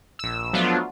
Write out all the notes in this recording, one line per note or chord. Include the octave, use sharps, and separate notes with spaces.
A#1 E6
F3 F#3 A3 B3 D4 F4